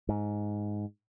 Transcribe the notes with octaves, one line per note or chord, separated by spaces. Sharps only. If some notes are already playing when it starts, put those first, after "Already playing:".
G#2